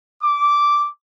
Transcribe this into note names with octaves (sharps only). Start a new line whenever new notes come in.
D6